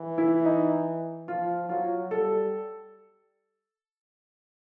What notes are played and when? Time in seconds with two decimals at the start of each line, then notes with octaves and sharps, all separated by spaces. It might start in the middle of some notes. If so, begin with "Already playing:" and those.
Already playing: E3
0.18 E4
0.45 D#4
1.28 F3 F4
1.69 F#3 F4
2.11 G3 A4